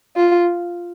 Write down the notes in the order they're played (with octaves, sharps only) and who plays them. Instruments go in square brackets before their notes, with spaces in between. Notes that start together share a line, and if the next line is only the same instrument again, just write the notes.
[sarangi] F4